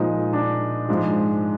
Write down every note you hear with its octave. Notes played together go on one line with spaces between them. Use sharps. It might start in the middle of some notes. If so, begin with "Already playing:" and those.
Already playing: A#2 F3 G#3 D#4
D4
G#2 F3 G#3